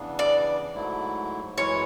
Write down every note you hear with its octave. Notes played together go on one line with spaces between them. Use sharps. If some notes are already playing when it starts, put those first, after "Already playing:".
Already playing: C#3 E3 B3 D4
D5
G#2 F#3 A3 E4
F#2 E3 G#3 C#4 E4 C#5